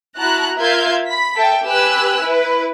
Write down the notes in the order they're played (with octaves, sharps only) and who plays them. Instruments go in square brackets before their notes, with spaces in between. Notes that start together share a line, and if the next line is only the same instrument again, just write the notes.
[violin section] E4 F#4 A5 A#5 F#6
F4 A#4 E5 F5 G6 G#6
B5 B6
A4 E5 G5
G4 B4 G#5 E6 F#6
E4 B4